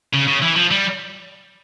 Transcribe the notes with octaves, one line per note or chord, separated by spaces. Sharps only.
C#3
C#3
E3
F3
G3